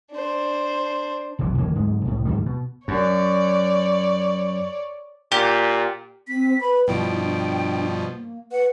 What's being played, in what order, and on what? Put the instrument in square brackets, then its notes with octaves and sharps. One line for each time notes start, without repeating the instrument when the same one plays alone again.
[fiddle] D4 C5
[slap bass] F1 B1 C3 E3
F1 D2 E3 A#3
D1 G#2 G#3
C2 A2
D2 G#2 D#3 G3
B2
[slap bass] F#2 [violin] C#5 D5
[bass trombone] A#2 [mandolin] G4
[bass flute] C4 [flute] B6
[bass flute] B4 [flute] B5
[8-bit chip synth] G2 B2 F3 [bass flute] E4 [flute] G5
[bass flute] D4
A#3
[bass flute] B4 [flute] F#5